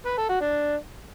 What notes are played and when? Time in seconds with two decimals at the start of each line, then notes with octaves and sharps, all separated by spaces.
0.06 B4
0.18 A4
0.29 F#4
0.41 D4